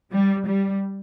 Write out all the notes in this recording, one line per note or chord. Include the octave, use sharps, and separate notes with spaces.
G3
G3